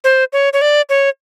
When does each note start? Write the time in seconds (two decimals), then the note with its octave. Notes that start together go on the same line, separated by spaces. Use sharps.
0.04 C5
0.33 C#5
0.53 C#5
0.62 D5
0.89 C#5